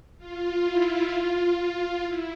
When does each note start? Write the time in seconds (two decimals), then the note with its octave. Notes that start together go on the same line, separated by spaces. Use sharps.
0.18 F4
0.63 E4
1.10 F4
1.56 F4
2.03 E4